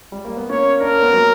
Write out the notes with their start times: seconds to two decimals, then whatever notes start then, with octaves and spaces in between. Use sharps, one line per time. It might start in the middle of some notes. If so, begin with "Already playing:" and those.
0.12 G3
0.25 A#3
0.37 B3
0.49 A#3 C#4 C#5
0.81 D4 A#4
0.91 C#4
1.02 B3
1.13 F#3 A#3